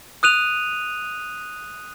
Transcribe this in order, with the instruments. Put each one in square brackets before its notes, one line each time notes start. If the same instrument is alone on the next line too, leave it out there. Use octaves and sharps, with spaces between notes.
[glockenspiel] D#6 F#6 D#7 F7